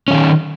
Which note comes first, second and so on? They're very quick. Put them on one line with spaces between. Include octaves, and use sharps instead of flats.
C#4 E3 D#3